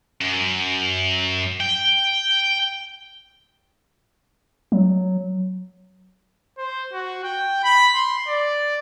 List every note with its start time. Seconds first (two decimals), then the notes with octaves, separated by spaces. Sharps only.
0.21 F#2
1.60 G5
4.72 F#3
6.58 C5
6.93 F#4
7.24 G5
7.64 B5
7.95 C6
8.28 D5